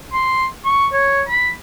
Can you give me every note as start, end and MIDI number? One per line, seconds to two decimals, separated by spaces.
0.13 0.45 84
0.65 0.87 85
0.93 1.22 73
1.28 1.51 83